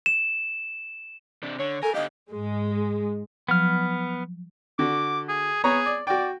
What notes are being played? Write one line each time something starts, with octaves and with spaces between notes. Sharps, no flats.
E7
C3 D4
D3 C#5
A4 A#4 G#5
D3 G4 D#5 F5
G#2 G#3
F3 F#3 B3 F6
D3 F#4 D6
G#4
B3 G#4 C#5 A#5
D5
F#4 D5 G5